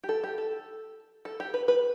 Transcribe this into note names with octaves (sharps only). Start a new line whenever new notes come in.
G4
A4
G4
A4
A4
G4
B4
B4